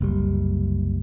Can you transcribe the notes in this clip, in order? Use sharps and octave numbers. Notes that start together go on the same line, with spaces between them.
F#1 C2 G3